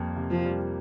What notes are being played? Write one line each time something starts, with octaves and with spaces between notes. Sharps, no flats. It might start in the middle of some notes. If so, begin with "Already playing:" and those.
Already playing: F2 G3 A#3
C3
F3
G3